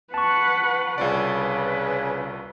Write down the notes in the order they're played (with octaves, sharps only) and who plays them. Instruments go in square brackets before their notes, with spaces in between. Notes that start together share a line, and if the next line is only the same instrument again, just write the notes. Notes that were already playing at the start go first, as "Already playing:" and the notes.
[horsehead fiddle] B4 F#5 [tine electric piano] A5 C#6
[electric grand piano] C2 F4 D5 [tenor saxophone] C#3 [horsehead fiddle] B4